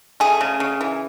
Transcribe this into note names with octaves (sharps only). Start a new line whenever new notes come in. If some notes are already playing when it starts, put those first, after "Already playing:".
A3 G#4
C#3
C#3
E3